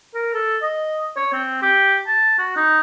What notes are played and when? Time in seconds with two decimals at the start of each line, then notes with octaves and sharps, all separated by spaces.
0.14 A#4
0.33 A4
0.62 D#5
1.16 C#5
1.32 C4
1.62 G4
2.07 A5
2.38 F#4
2.56 D#4